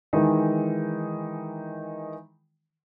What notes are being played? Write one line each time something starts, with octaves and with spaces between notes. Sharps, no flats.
D#3 E3 G#3 D#4